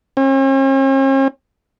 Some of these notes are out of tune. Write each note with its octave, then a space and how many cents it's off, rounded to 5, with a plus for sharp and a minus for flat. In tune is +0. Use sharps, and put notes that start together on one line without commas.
C#4 -45